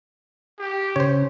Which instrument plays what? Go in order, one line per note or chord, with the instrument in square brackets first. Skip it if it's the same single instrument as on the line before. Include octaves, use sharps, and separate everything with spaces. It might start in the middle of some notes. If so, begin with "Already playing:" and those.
[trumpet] G4
[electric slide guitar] C#3 [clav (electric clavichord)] C5 C#5